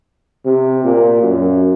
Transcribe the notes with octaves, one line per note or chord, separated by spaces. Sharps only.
C3
A#2
F#2